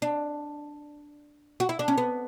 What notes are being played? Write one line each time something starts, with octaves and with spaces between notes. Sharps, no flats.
D4
F#4
E4
D4
C#4
B3